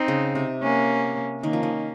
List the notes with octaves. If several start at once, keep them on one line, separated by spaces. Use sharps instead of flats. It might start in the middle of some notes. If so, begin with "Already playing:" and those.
Already playing: C4 D#4
C#3
C3
A#3 C#4
D#3 A#3 C#4
F3
D#3